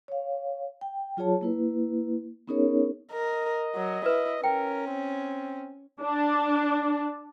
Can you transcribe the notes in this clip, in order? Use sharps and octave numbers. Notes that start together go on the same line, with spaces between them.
C#5 F5
G5
F#3 F4 G#4 C#5 A5
A#3 E4 B4
B3 C#4 D#4 G#4 A#4 C#5
A#4 D#5
F#3
E4 B4
C#4 A#4 G5
C4
D4